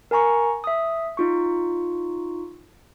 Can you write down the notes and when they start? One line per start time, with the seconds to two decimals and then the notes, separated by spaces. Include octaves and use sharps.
0.11 A#4 G#5 A#5 C#6
0.64 E5 D#6
1.17 D#4 F4 C#6